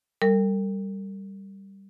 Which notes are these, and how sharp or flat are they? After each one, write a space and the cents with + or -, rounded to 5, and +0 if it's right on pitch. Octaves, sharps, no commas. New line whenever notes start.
G3 +0 A#4 -45